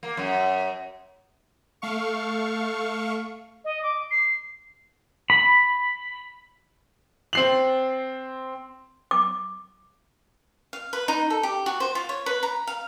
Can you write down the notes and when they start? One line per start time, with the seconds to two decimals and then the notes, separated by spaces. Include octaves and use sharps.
0.03 A#3
0.17 F#2
1.82 A3 F5 C#6
3.65 D#5
3.83 D6
4.11 C7
5.30 B5
7.33 C4 C7 F#7
9.11 D6
10.73 F5
10.93 B4
11.08 D#4
11.30 A4
11.43 G4
11.66 F#4
11.80 C5
11.95 F4
12.09 C#5
12.26 B4
12.43 A#5
12.67 F5